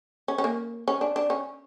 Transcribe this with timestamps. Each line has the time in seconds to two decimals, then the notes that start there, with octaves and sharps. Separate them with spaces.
0.28 C#4
0.38 C#4
0.44 A#3
0.88 C#4
1.01 D4
1.16 D4
1.30 C#4